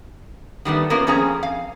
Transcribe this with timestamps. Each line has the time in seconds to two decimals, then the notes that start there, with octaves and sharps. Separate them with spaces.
0.65 D#3 G3 A3 B3
0.90 A#3 B3 C#4 F4 A#4
1.07 F2 C4 C#4 G#4 F5 A#5
1.43 F5